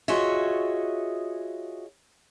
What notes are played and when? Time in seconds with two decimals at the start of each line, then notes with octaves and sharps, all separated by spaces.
0.08 F4 F#4 G#4 C#5 D#5 E5